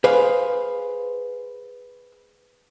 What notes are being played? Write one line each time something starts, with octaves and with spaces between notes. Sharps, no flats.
G#4 B4 C5 F5